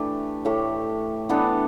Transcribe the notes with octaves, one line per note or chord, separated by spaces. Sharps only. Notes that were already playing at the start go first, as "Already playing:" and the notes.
Already playing: E3 A3 D4 G4
A2 A3 G4
E3 B3 D4 A4